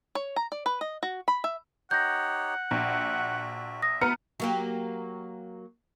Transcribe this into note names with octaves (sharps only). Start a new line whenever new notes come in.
C#5
A#5
D5
B4
D#5
F#4
B5
E5
D#4 G4 C#5 F#5 G6 A#6
A#1 F#4 E5
E5 D#6 A#6
B3 A#5 F6 C#7
F#3 A#3 G4